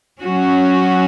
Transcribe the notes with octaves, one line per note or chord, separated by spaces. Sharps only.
F#3 C#4 F#4